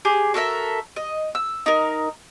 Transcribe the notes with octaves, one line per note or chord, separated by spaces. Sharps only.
G4 G#4 G#5
F#4 A4 A#4 E5
D#5
E6
D#4 A#4